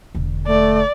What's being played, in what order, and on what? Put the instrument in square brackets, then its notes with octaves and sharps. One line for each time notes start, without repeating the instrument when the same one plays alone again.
[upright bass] E1 D3
[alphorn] A3 [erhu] D5